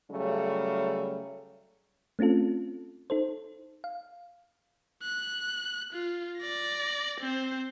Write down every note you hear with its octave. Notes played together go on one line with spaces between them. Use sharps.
C#3 F#3 G3 A3
A3 C4 C#4 F4 A4
D#4 A4 C5
F5
F#6
F4
D5 A#6
C4 C5